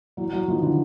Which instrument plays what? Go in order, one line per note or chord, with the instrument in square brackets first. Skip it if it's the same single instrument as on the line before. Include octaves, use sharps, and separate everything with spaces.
[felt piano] E3 F#3
E3 F#3
D#3 F3
D3 E3